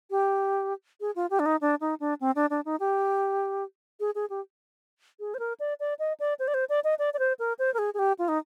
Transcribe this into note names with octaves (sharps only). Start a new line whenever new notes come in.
G4
G#4
F4
G4
D4
D#4
D4
D#4
D4
C4
D4
D4
D#4
G4
G#4
G#4
G4
G#4
C5
A#4
D5
D5
D#5
D5
C5
D5
C5
D5
D#5
D5
D5
C5
A#4
C5
A#4
G#4
G#4
G4
F4
D#4